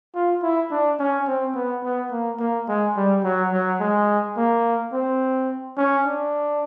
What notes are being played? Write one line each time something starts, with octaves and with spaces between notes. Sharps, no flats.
F4
E4
D4
C#4
C4
B3
B3
A#3
A#3
G#3
G3
F#3
F#3
G#3
A#3
C4
C#4
D4